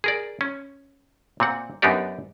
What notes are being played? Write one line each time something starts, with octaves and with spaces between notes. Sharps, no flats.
G#4 A#4 D5
C#4
A#2 C4 F#5
F#2 B3 D4 D#4 G4 D5